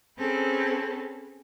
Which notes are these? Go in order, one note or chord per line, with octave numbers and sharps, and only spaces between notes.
C4 C#4 G#4 A4 B4